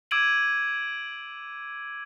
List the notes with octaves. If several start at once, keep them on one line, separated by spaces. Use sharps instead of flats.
D6 E6 G#6 D7 D#7 F#7